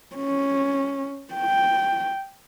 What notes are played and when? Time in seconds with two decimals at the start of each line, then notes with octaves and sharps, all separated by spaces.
0.15 C#4
1.34 G5